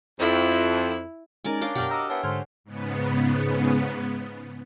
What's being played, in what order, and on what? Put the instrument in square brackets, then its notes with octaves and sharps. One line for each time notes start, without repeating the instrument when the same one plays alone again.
[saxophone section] F2 [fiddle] E4
[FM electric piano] G#3 C#4 D#4 [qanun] A#4 D5 G#5
[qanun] D4 D5 F5 [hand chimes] C#5
[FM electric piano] F#2 B2 [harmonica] D4 G5 [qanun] G4 A#4 [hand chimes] F#5 F6
[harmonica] F#4 D#5 D6 [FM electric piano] A#5 [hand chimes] E6
[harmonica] B3 E4 [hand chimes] C#5 F#5 G#5 [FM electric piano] A5
[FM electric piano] G#2 D3 F6 [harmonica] A3 C5 [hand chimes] G#6
[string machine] G#2 C#3 B3